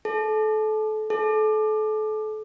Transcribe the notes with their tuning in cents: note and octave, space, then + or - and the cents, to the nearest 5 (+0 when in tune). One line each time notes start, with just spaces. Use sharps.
A4 -30
A4 -35